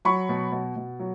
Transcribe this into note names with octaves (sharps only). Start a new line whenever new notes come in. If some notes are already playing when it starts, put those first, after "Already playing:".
F#3 B5 C#6
B2
B2
B2
F#3